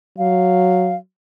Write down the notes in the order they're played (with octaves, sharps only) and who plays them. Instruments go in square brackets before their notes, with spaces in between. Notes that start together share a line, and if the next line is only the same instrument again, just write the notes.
[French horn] F#3 [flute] F5